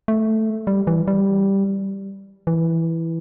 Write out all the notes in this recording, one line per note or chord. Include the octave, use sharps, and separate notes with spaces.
A3
G3
E3
G3
E3